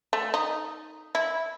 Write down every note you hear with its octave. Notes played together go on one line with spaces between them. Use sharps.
A3
D#4
E4